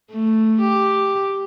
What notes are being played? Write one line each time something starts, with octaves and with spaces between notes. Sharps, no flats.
A3
G4